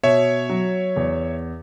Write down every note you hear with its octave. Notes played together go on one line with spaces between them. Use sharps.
B2 C#5 E5
F#3
E2